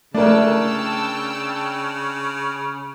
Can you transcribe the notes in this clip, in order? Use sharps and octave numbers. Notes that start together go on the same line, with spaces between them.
C#3 A3 D4 A#4 G5 A5 E6